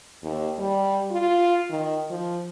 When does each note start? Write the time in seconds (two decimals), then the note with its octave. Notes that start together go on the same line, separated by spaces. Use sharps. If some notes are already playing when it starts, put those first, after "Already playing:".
0.23 D#2
0.59 G3
1.11 F4
1.70 D#3
2.10 F3